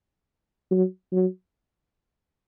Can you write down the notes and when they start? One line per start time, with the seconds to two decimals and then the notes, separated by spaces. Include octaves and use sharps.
0.71 F#3
1.12 F#3